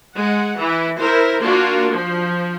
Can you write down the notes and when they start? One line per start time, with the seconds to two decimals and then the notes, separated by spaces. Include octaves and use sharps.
0.14 G#3 F#5
0.59 E3 E4
1.00 E4 A#4 C5
1.41 A#3 D4 F4 F#4
1.92 F3